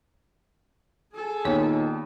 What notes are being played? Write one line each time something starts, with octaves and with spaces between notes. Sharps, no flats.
G#4 A4
D#2 A#2 D#3 B3 C#5